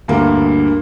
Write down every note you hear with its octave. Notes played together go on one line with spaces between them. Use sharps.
D2 G2 A#3